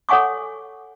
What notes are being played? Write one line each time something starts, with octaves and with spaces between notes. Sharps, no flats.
A4 C#5 F#5 G#5 C#6 D6